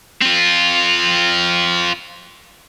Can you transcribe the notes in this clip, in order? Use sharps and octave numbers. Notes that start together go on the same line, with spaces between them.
C4 F4